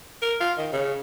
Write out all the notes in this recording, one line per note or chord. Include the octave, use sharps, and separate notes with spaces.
A#4
F4
D#3
C#3